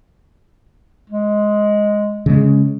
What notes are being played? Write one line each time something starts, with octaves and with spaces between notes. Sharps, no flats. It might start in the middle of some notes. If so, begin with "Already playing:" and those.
G#3
C#3 G#3